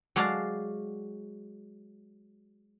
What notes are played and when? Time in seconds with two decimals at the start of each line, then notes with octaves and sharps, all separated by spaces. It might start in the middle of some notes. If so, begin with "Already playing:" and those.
0.16 F#3 G#3 F#4 D5 F5 A5